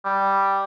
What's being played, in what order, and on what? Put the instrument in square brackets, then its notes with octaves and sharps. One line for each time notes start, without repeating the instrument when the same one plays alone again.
[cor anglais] G3